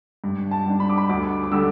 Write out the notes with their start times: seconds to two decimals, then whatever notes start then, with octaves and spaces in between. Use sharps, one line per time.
0.24 G2
0.51 A5
0.66 G3 D4
0.80 B5
0.89 D6
0.98 B5
1.09 D2 D6
1.43 D6
1.52 D3 G3 E6